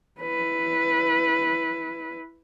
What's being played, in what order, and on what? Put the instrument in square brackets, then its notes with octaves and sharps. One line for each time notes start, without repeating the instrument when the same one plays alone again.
[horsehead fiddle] E4 B4